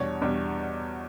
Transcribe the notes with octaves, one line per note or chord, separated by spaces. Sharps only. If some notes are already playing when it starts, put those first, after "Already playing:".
Already playing: E2 B2 G3 D4 C#5
E2 B2 G3 D4